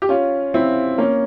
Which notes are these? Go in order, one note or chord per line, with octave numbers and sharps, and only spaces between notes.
G4
C#4 F4
C4 E4
A#3 C#4